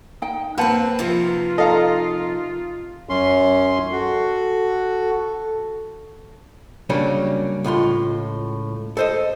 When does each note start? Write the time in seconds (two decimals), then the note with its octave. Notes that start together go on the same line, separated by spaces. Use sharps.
0.22 D#4 G5
0.58 A#3 C4 B4 C5 F#5 A5
0.99 C3 D#3 F3 F4
1.58 D#4 A4 D#5 F5 A#5
3.09 F#2 C#4 C6
3.92 F#4 A4
6.90 C#3 F#3 G3 A#3 C#4 D4
7.64 C#2 A2 F4 C6
8.97 A4 C5 D#5